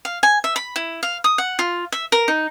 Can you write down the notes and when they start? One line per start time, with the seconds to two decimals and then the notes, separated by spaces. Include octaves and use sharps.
0.05 F5
0.23 G#5
0.44 E5
0.56 B5
0.76 E4
1.03 F5
1.24 D#6
1.38 F#5
1.59 F4
1.92 E5
2.12 A#4
2.28 D#4